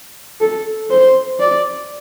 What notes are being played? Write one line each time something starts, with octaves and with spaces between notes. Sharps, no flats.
A4
C5
D5